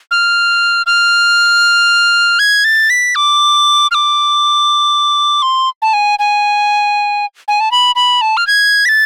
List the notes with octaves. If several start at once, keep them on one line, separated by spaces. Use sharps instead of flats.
F6
F6
G#6
A6
B6
D6
F6
D6
C6
A5
G#5
G#5
G#5
A5
B5
B5
A5
F6
G#6
B6
A6